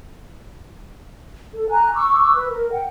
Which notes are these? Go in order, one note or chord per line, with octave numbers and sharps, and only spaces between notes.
A4
G#5 A#5 F#6
C#6 D6 E6 F#6
B4
A#4
F#5 G5